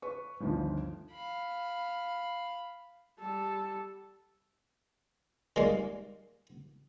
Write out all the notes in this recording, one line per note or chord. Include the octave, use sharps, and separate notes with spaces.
B4 C#6
G1 D2 D#3 F3
F5 B5
G3 A4
D#3 G3 G#3 A#3